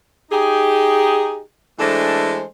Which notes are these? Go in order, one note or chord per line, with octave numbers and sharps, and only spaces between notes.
D#4 G4 G#4
E3 G#3 A3 D4 A4 C5